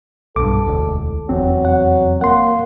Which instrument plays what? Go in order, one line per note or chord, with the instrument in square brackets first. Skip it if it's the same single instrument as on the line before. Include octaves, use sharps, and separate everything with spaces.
[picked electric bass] B1 G2 [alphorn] A4 [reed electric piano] D6
[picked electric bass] E1 D2
[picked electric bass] F1 E2 C4 [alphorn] F#3
[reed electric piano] F#5
[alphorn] A#3 [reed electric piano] F#5 C6